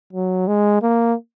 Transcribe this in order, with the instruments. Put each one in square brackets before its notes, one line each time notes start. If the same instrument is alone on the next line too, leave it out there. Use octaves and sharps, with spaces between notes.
[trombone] F#3
G#3
A#3